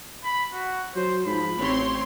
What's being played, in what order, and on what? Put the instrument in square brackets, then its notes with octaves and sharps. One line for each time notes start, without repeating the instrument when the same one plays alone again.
[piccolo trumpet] B5
F#4
[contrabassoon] F#3 [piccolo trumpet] C5
[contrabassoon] G#2 [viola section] F3 [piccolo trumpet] B5
[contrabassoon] A1 [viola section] C4 C#5 C6